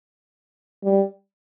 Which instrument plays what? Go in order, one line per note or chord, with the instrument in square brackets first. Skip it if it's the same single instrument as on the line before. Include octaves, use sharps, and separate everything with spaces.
[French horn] G3